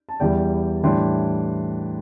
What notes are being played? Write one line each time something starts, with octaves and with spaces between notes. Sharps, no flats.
A5
E2 E3 G3 D5 G5
A2 E3 G3 D4 G5 C6